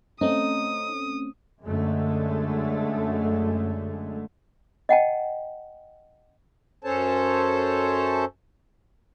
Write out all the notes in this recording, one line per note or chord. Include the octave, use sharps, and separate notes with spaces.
A3 C4 C#4 D#4 D#6
F#2 D3 G#3 A3
D#5 F#5 G5 A5
F#2 C#4 A4 C5 C#5 A5